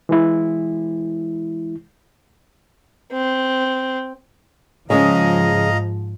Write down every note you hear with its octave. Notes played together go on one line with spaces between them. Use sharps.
E3 G#3 E4
C4
G#2 C#3 F3 G#3 D#5 F5 A#5